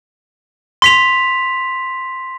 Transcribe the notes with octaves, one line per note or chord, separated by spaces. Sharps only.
C6 B6 F7